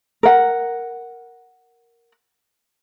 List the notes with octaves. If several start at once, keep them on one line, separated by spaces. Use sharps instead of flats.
A#4 F#5